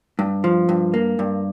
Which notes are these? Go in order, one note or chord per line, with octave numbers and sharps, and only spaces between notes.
G2
F3
G2
A#3
G2